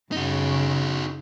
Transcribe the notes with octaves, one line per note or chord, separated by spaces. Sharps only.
F#2 C#3 D#4 F#4